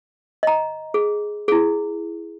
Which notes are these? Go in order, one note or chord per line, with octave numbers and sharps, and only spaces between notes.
D#5 A#5
G#4
E4 G#4